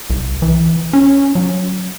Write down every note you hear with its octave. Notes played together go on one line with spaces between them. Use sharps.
C2
E3
C#4
F#3